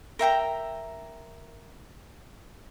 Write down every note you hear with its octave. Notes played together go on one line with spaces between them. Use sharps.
A#4 E5 G5 A#5